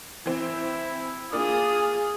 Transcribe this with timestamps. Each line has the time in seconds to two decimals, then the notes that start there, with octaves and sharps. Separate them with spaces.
0.26 E3 C4 E4
1.33 A#3 D4 F4 G#4 D#6